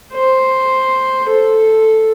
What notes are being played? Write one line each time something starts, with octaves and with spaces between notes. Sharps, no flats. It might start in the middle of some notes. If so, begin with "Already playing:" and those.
C5
A4